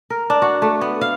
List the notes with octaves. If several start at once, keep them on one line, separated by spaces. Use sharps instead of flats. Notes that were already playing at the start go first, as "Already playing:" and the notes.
A#4
D4
F#4
A3
B3
F5